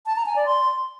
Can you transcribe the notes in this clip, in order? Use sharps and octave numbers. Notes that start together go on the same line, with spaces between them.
A5
A#5
G#5
D5
C6